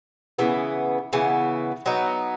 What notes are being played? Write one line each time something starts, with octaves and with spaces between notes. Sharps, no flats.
C#3 E3 B3
C#3 E3 B3
F#3 B3 D#4